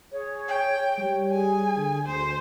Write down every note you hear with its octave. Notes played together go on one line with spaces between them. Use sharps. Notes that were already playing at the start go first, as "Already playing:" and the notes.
G#4 C#5
G5
G3 C#5
G#4 G#5
D3
D2 C5